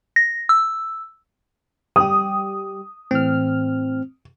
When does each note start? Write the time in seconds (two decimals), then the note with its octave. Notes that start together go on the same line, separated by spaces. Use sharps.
0.16 A#6
0.49 E6
1.96 G3 G4 D#6
3.11 A2 E3 C4 F6